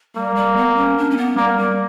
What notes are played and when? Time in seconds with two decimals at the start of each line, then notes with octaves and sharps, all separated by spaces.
0.16 G3 A#3
0.36 G3
0.56 B3
0.76 C#4
0.97 D4
1.10 C#4
1.17 B3
1.37 G3 A#3
1.58 G3